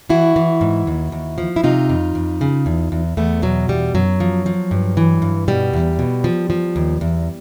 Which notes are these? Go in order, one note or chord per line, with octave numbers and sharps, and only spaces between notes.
E3 E4 F#4
E3
G#2
D#2
D#2
F3
E4
C3 D#4 F4
F2
F2
C#3
E2
E2
E2 A3 B3
B2 F#3
E2 G3
F#2 F#3
F3
F3
G2
E3
G2
B2 G3
E2
B2
F3
F3
D#2
E2